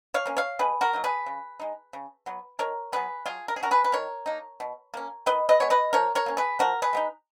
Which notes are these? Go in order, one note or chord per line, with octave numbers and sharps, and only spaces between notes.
C#5 F5
A#3 C#4
C#5 F5
B2 G#4 B4
F#4 A#4
F#3 A#3 D#4
G#4 B4
C#3
G#3 D#4
C#3
F#3 B3
D#3 A#4 C#5
F#3 B3 D#4 G#4 B4
F#3 F4 G#4
A#4
G#4
C#4 F#4 A#4
G#4 B4
B4
D#3 A#4 C#5
A#3 D#4
B2
A#3 C#4
D#3 B4 D#5
B4 D#5
G#3 B3 C#5
B4 D#5
F3 A#4 C#5
A#4 C#5
A#3 C#4
G#4 B4
F3 F#4 A#4
G#4 B4
G#3 B3 D#4